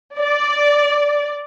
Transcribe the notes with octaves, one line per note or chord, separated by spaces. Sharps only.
D5